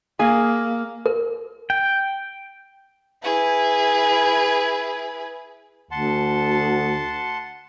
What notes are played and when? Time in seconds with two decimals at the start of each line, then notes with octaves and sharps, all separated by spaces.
0.19 A#3 G#4 G#5
1.06 A#4
1.70 G5
3.22 E4 G#4 B4
5.91 D2 F#5 A5 C6